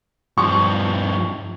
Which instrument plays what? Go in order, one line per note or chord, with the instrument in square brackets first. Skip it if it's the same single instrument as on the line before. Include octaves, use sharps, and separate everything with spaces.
[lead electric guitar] G2 F3 [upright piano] C#6